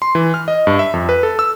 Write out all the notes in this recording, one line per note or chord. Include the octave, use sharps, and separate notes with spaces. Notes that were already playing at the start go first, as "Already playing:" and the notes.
C6
E3
F6
D#5
G2
E5
F2
B4
A4
E6